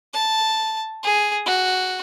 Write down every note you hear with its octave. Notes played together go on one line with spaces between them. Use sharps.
A5
G#4
F#4